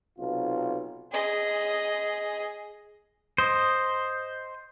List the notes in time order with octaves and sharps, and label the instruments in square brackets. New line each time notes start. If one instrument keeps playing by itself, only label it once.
[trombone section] B1 C3 F4
[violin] G#4 D#5
[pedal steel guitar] C5 D#5